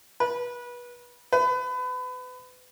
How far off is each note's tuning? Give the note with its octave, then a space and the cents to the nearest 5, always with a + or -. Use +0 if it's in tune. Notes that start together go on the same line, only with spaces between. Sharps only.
B4 -25
B4 +30